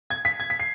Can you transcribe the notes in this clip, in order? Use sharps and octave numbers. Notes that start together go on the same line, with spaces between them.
G#6
B6
G#6
B6
C7